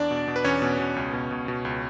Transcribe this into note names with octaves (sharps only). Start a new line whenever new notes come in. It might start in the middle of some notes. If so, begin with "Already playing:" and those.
Already playing: E2 D4 D5
B2
B2
B4
E2 C#4 C#5
B2
B2
C#2
B2
B2
B2
C#2